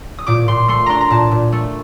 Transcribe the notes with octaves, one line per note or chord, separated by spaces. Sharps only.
D#6
A#2 D6
A#2 C6
A3 C6
D4 A#5 C6
A#5
A#2 A5
A#2
A3